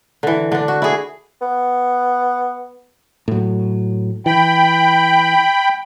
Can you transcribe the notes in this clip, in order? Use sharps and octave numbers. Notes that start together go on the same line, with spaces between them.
D3 E3
D3 D4
F#4
E4 G#4
B3
A2 F#3
E3 G5 B5